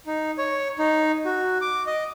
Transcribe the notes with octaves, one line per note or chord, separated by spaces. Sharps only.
D#4
C#5
D#4
F#4
D6
D#5